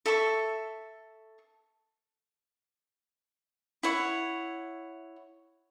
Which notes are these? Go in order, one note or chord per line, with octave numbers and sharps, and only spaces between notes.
A4 E5 C#6
E4 C#5 F#5